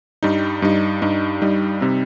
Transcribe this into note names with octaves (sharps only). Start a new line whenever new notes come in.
G2 G3 D#4
G2 G3 D#4
G2 G3 D#4
G2 G3 D#4
C3 G3 C4 D#4